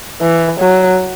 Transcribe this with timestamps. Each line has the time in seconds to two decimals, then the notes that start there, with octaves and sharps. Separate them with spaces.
0.21 E3
0.60 F#3